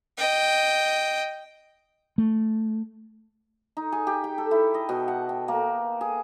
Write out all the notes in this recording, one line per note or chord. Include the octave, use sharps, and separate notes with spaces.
D#5 G5
A3
D#4
G#4
G4
G5
A4
E4
D#5
B2
F#5
G5
A#3
G#4